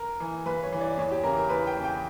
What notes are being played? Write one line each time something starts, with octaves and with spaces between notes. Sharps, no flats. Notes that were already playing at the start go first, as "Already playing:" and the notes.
Already playing: A#4
E3
G2 B4
C#5
E3
D5
E2 C#5
G4
C#3 E3 A#4
A#4
E2 B4
G5
C#3 E3
G5